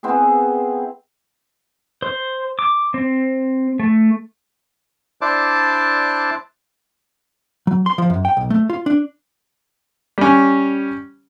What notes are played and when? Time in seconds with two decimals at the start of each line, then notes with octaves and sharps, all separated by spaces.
0.03 B3 C4 E4 G#4
2.02 C5
2.59 D6
2.94 C4
3.80 A3
5.21 D4 E4 C5 D5 A5 D6
7.67 F#3
7.86 C6
7.98 F3
8.10 F#2
8.25 G5
8.37 B1
8.50 A3
8.70 F4
8.86 D4
10.18 G3 C#4